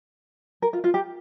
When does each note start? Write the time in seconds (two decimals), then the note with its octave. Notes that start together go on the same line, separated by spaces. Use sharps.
0.62 A#4
0.73 F4
0.84 F4
0.94 G4